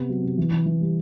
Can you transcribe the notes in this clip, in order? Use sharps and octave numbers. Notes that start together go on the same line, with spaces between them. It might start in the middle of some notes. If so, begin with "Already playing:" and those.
Already playing: C3 B3
F#3
C3
E3
E3
E3
G3